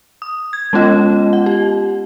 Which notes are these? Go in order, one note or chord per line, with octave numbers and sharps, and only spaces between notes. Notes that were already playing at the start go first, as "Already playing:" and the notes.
D#6
G#6
G#3 B3 C#4 F4 D#5
F#5
G4